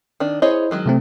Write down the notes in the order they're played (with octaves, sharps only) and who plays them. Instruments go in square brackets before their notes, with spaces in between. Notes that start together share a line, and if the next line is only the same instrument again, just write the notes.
[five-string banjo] D#3 D4
[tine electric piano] E4 C5 [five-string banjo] G#4 C#5 D#5
[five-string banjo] D#3 F#3 G#3
[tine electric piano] C3 A3 C4